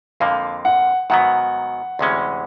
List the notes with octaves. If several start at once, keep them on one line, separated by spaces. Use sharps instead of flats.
F2 D3 F3 A#3 F5
F#5
G#2 D#3 F#3 B3 F#5
D2 C3 E3 G#3 C#4